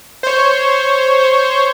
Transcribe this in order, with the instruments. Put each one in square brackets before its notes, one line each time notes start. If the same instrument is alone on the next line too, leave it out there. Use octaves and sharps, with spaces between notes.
[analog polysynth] C5 C#5